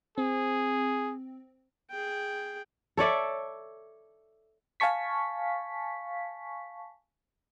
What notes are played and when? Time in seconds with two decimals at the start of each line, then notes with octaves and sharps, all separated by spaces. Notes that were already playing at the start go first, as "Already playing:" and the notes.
0.18 C4 G#4
1.90 G#4 G5
2.97 A4 C#5 D5 E5
4.80 F5 G#5 A5 C#6 B6